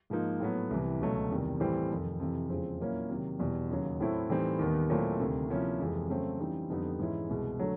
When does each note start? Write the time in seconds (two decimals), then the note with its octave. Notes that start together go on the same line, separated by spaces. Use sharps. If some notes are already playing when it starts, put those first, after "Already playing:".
0.10 G#2 F3 A#3 D#4
0.40 A2 F#3 B3
0.70 C2 C3 E3
1.01 C#2 B2 F#3 A3
1.30 E2 C3 D#3 G3
1.60 A2 E3 G3 C4
1.90 F2 C3 D#3
2.20 F2 C3 E3
2.49 E2 C#3 F3 G#3 C4
2.80 A#2 F#3 A#3 C#4 E4
3.10 C3 D#3 F#3
3.39 E2 B2 G3
3.69 D#2 C#3 F#3
4.00 A2 F#3 A3 C4 E4
4.30 A2 E3 G3 C4 D#4
4.59 D#2 D#3 G3 B3
4.90 A#2 F#3 A3 C4 E4
5.20 D2 C3 D#3
5.49 C3 F3 A#3 C#4 E4
5.80 F2 C3 E3 G#3
6.10 C#3 F#3 A3 C4
6.39 C#3 E3 G3 C4 D#4
6.70 F2 D3 G3 B3 D#4
6.99 G#2 E3 G#3 C#4 E4
7.29 C2 B2 G#3
7.59 D3 F#3 A3